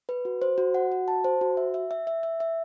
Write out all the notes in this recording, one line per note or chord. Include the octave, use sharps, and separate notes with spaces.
B4
F#4
C5
F#4
F#5
F#4
A5
C5
F#4
E5
E5
E5
E5
E5
E5